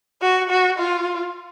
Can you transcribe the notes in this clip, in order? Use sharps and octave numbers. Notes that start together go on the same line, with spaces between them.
F#4
F#4
F4